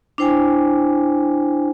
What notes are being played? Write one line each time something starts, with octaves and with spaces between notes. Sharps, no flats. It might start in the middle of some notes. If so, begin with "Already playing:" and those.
D4 E4 C5 G5 G#5